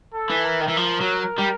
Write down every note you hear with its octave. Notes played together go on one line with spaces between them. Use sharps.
A4
E3
A#4
D#3
E3
F3
F#3
G3